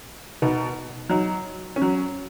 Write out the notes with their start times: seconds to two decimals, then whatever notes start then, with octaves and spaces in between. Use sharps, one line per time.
0.42 B2 B3 D#4
1.10 F#3 D#4
1.76 C#4
1.82 F#3